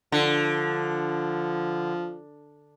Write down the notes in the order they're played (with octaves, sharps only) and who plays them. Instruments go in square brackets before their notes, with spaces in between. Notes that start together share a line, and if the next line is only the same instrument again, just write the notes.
[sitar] D3 [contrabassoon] F3